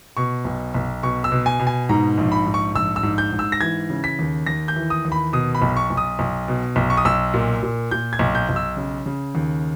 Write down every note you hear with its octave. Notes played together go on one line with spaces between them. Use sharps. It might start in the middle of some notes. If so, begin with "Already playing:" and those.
B2 C#6
B1
B1
B2 C#6
E6
B2
G#5
B2
G#5
G#2 A#5
A#1
B5
G#2
C#6
A#1 E6
E6
G#2
G6
G#2
E6
A#6
E3 G#6
C#3
B6
D#2
D#2 A#6
G6
E3
D#6
D#2
B5
B2 D#6
B5
B1
C#6
B1
D#6
B1
B2
B1
C#6
D#6
B1 E6
A#2
A#2
A#2 G6
G#6
B1
G6
B1
E6
C#3
C#3
D#2